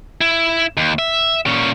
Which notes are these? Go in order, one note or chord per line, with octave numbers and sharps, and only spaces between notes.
E4
D#2
E5
A#2 C#4